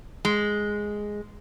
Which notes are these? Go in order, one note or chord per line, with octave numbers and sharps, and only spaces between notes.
G#3